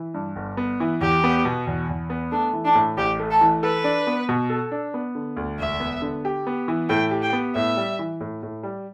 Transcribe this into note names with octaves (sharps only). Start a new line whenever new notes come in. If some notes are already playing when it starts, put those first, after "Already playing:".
Already playing: E3
G2
G1
B3
E3
E2 G4
B3
B2
E2
E2
B3
A3 D4
E3
D4
A2
A1 G4
A3
A4
E3
A4 B4
D4
B3
B2
A4
D4
B3
D3
D2
E1 E5
B3
D3
G4
B3
E3
A2 G5
G4
G5
B3
A2 E5
G3
E3
A2
A2
G3